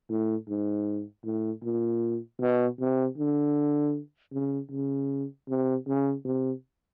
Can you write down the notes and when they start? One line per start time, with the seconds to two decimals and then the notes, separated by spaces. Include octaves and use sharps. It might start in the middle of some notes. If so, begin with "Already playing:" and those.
0.09 A2
0.49 G#2
1.25 A2
1.64 A#2
2.41 B2
2.80 C3
3.18 D3
4.33 C#3
4.71 C#3
5.48 C3
5.87 C#3
6.25 C3